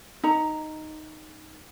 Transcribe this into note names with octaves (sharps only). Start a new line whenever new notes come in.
D#4 A#5